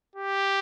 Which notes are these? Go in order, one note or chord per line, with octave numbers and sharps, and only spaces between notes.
G4